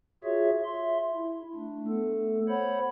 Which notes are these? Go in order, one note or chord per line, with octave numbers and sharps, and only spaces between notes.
F4 F#4 G#4 C#5 E5
E5 C6
E4
A3 D4
A3 B3 A4
C5 C#5 F#5 B5